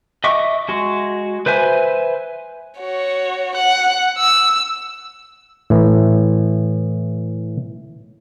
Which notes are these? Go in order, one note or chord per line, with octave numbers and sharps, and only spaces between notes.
D#5 E5 C#6 D6
G#3 F#4
B4 C5 E5 G#5
F#4 C#5
F#5 F#6
E6
A2 E3